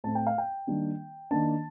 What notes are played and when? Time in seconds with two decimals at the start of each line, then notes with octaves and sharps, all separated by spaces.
0.04 A2 A3 C4 A5
0.15 G5
0.27 F5
0.38 G5
0.67 D#3 G3 A#3 D4
1.31 D#3 A#3 D4 A5